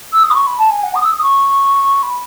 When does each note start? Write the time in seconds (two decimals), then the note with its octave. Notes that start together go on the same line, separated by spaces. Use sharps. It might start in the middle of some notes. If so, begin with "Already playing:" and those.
0.13 E6
0.23 D#6
0.31 B5
0.35 C#6
0.47 B5
0.58 A5
0.71 G#5
0.83 F#5
0.95 D#6
1.04 E6
1.12 D#6
1.22 C#6
2.03 B5